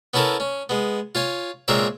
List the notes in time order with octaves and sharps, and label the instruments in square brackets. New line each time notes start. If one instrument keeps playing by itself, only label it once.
[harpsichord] B3 C#4 E4 A4 A#4
C#4
G#3 B3
F4 C#5 G#5
A#2 G#3 C4 A#4 C#5 E5